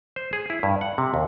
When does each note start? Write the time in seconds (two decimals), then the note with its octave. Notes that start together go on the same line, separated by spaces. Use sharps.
0.16 C5
0.33 G#4
0.50 E4
0.63 G2
0.81 F#5
0.98 C3
1.14 D#2